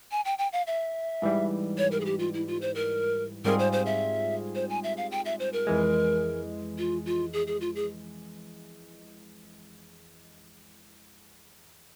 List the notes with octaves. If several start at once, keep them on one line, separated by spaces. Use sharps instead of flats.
G#5
G5
G5
F5
E5
G#2 E3 G3
C#5
A#4
G#4
G4
F4
E4
F4
C5
A#4
G#2 G3 C4 F4 G#4 A#4
C5
C5
E5
C5
G#5
E5
F5
G5
E5
C5
A#4
F2 E3 G#3
F4
F4
G#4
G#4
F4
G#4